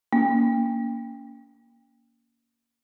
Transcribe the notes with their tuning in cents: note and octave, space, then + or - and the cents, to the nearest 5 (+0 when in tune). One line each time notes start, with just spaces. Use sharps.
A#3 +0 C#4 +25